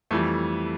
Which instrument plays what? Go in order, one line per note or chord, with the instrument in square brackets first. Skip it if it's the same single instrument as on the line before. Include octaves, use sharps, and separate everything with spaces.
[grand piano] F2 E3 G3 A3